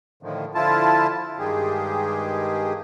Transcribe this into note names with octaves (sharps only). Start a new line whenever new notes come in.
A2 D3 D#3 F3
D3 F3 E4 F4 A5
G2 D#3 G#3 G4 G#4